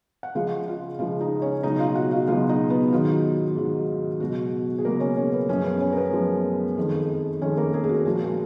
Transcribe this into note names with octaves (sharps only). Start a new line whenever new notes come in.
F#5
C#2 C#3 F3 G#3 F4 F5
F4 F5
C#2 C#3 F3 G#3 F4 F5
D#4 D#5
C#4 C#5
C#2 B2 F#3 D#4 D#5
F4 F5
F#4 F#5
F4 F5
C#2 B2 F#3 F4 F5
D#4 D#5
B3 B4
G#2 D#3 F#3 F4
G#2 D#3 F#3
C#2 B2 F#3 F#4
G#4
C#2 B2 F#3 A#3 A#4
C#4 C#5
C#4 C#5
B3 B4
F#2 F3 G#3 C#4 C#5
B3 B4
C#4 C#5
A#4
B3 B4
F#2 F3 G#3
F2 D#3 G#3
F2 D#3 G#3 C#4 C#5
A#3 A#4
G#3 G#4
G#4
F#4
A#2 F3 G#3 G#4
F#4
G#3 G#4